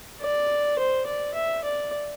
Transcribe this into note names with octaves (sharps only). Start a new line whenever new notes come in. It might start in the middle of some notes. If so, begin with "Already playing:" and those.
D5
C5
D5
E5
D5